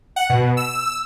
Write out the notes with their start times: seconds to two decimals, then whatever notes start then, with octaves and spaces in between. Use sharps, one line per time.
0.16 F#5
0.30 B2
0.57 E6